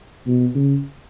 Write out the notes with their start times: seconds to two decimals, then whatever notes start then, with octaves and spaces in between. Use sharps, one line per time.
0.27 B2
0.55 C#3